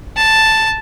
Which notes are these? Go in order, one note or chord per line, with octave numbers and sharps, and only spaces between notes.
A5